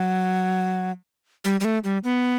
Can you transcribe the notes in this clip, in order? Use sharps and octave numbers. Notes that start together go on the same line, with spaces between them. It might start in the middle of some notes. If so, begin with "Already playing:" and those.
Already playing: F#3
G3
G3
A3
G3
B3